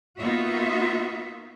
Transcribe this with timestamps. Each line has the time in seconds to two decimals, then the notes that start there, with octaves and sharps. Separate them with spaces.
0.19 A#3 B3 D#4 F4 F#4 E5